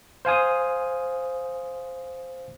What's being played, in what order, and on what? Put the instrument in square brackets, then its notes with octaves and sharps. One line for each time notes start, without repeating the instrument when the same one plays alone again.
[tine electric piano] C5 F5 G#5 D#6